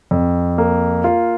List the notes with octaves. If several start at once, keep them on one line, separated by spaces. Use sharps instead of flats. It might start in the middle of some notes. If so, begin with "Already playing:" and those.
F2
A#3
F4